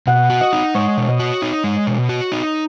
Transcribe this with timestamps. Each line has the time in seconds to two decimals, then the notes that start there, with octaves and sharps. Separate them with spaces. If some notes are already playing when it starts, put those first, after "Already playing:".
0.07 B2 F#5
0.30 F#4
0.41 D#5
0.53 D#4
0.75 G#3 C#5
0.97 B2
1.08 D#5
1.19 F#4
1.42 D#4
1.64 G#3
1.87 B2
2.09 F#4
2.32 D#4